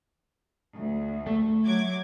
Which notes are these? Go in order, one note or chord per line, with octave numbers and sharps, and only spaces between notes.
D2
A3
F#3 D6 G#6